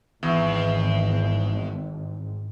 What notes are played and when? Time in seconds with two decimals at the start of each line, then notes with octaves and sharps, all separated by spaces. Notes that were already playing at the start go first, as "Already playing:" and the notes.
0.23 G#1 E2